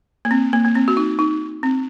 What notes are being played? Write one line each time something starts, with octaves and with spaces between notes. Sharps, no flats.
A#3
C4
A#3
A#3
C4
F#4
D#4
D#4
C4